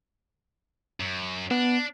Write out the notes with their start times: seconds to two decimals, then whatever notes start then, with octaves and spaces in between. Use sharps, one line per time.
1.00 F#2
1.51 B3 D4